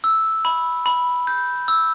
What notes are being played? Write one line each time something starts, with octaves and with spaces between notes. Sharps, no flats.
E6
B5
B5
G6
E6